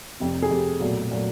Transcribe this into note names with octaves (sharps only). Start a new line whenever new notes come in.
F1 F2 C3
G#4
F1 F2 C3 G4 A4
B1 A#2 F#3 A3
A#2 F#3 A3